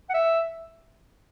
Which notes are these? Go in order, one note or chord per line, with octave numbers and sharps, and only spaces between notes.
F#5
E5